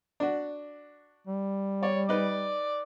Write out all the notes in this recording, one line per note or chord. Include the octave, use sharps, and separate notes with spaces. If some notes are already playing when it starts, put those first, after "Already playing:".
D4 F#4
G3
C#5 D5
D#4 B4 D5 D6